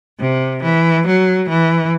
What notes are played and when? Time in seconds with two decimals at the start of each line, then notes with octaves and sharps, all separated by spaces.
0.19 C3
0.62 E3
1.05 F#3
1.48 E3